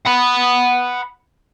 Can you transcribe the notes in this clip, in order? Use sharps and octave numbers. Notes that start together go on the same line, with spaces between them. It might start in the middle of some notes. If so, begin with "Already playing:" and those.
F#5 B5